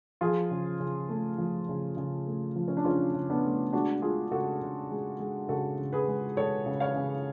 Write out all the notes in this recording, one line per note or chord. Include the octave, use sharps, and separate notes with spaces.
F3 F4 G#4
C#3
C#3
A3
F3
C#3
C#3
A3
F3
C#4
D4
C#3 C#4 F4
C#3
B3 D4
A3
G#3 D4 F#4
G#3 F4 G#4
C#3 F#4 A4
C#3
G#3
G#3
C#3 F#4 A4
C#3
G#4 B4
G#3
G#3 A4 C#5
C#3
C#5 F5
C#3